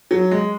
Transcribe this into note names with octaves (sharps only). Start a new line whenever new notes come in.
F#3
G#3